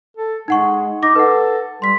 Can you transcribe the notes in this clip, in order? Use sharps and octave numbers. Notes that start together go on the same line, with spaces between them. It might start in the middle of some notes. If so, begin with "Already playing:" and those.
A4
G#3 D#4 F#5 C#6
D#4 D6 A#6
A4 B4 F#5
G3 C6 B6